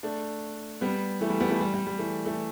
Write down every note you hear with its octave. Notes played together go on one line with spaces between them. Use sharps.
A3 D4
G3 B3
E3 A3
G3
G3 B3
E3 A3
G3
G3
G3
E3 A3
E3 A3